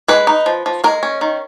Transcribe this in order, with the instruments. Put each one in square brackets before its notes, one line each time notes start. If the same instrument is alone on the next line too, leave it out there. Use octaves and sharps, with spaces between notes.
[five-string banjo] G#3 B4
D#4
F3
F3
G#3 A#4
C#4
D#3